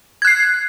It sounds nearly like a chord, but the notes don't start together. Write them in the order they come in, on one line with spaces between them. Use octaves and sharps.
G#6 F#6 C7